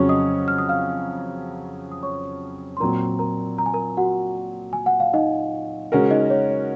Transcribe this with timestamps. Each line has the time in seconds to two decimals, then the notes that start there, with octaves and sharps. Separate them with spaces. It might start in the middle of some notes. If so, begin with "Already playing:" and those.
Already playing: F2 C#3 F#3 C#4 F#4 C#5 C#6
0.09 D#5 D#6
0.48 F6
0.58 D#6
0.69 F5 F6
1.92 D#6
2.03 C#5 C#6
2.77 C6
2.80 A#2 F#3 C4 A#4 A#5
3.19 A#4 A#5
3.58 A#5
3.66 G#5
3.74 A#4 A#5
3.97 F#4 F#5
4.73 G#5
4.86 F#5
5.00 F5
5.14 D#4 D#5
5.92 C#3 G#3 C#4 F#4 A#4
6.11 D#4 D#5
6.30 C#5
6.50 C#5